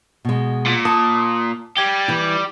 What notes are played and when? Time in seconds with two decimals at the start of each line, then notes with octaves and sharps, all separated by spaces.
0.25 B2 G#3
0.66 A#2
0.85 A5 D#6
1.78 G3 G4 G#6
2.08 E3 E4